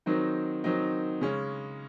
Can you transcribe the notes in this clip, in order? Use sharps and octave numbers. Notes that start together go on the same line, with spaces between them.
D#3 F#3 C4 D#4
D#3 F#3 C4 D#4
C#3 G#3 C#4